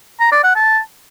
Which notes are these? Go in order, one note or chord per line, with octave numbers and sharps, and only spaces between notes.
A#5
D5
F#5
A5